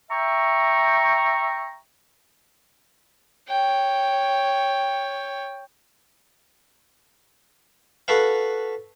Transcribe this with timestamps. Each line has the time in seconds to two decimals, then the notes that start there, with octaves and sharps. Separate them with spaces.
0.11 E5 G5 A#5 C#6
3.48 C#5 G5
8.08 F#4 A4 B4 F5